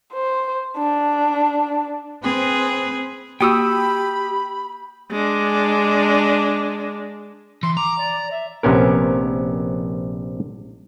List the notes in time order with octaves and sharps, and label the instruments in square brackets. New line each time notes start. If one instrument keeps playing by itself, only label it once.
[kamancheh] C5
D4
[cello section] C4 [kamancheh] G#4 B4
[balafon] A#3 F#4 [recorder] G4 [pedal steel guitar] G5 D#6 E6 [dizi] B5
[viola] G#3 D4
[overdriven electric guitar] E3 [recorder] C6
[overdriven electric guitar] A#5 [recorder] D6
[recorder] D5
E5
[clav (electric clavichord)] A#1 C3 B3 C#4 A#4